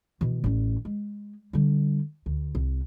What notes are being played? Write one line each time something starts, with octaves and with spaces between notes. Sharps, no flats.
B2 E3
A1 C#4
G#3
D3 G3
D2
C2